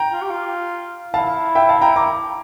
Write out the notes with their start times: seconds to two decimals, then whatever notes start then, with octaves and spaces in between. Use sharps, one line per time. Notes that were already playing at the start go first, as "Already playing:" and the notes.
Already playing: G5 A#5
0.13 F4
0.22 G4
0.31 F4
1.14 E4 F5 A5
1.55 E5 G5
1.69 F5 A5
1.81 G5 A#5
1.96 A#5 D6